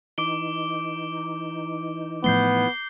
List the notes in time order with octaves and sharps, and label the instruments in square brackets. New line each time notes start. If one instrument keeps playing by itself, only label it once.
[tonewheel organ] E3 D#4 [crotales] D6 D7 G7
[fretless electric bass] A2 F3 A3 [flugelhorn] B3 [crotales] G6 C7 G7